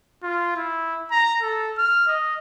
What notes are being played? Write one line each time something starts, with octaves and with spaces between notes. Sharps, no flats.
F4
E4
A#5
A4
F6
D#5